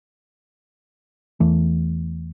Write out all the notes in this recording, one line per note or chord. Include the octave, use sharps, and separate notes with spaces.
E2 E3 A3